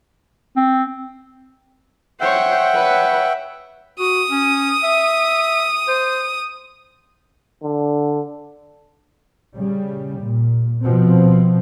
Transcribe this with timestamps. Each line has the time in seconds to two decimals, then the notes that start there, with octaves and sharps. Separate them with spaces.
0.56 C4
2.21 C5 C#5 E5 F#5 G5
2.75 B4 C#5
3.99 F#4 D#6
4.30 C#4
4.83 E5
5.88 C5
7.63 D3
9.55 C#3 G3
10.22 A#2
10.82 B2 F3 C4